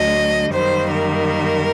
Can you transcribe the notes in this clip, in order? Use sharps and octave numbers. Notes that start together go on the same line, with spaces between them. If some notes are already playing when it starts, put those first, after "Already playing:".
Already playing: D2 D3 F#3 D#5
F#2 D#3 G3 A#3 C5
A#4